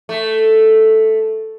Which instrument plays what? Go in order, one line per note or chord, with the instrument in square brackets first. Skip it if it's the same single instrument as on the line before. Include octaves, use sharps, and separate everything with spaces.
[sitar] A3